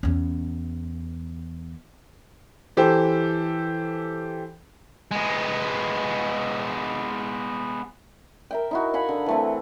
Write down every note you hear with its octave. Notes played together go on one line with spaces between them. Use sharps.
E2 C#4
E3 G4 A4 C5
G#3 B3
A#4 E5 G5
D#4 E4 F#4
F5 F#5 G#5 B5
D3
E3 A3 C4